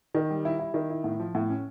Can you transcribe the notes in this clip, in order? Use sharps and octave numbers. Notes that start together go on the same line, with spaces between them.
D#3
G3
E4
E4
D#3
E4
A2
F3
A2
C#4